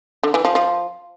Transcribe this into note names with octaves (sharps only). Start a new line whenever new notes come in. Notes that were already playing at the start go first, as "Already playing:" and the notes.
D3
E3
F3
F3